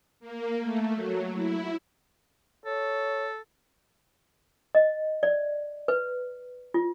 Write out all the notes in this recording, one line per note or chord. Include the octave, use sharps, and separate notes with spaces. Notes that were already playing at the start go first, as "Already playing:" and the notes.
A#3
A3
F#3
E4
A4 C#5
D#5
D5
B4
F4